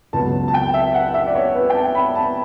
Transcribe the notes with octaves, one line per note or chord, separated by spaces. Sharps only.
C#2 B2 F#3 A5
A5
G5
E5
F#5
E5
D5
C#5
B4
G5
A5
B5
A5